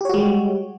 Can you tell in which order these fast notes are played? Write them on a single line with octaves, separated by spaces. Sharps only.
G4 C#5 F#4 G#3 G3